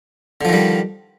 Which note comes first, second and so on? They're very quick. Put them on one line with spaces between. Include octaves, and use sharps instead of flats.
D3 F3 D#3 G3